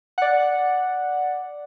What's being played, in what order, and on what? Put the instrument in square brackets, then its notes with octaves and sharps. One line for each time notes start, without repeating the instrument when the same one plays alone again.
[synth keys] D5 F#5